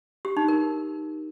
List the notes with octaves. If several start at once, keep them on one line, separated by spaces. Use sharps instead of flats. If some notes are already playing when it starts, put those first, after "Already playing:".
G4
D#4
A#4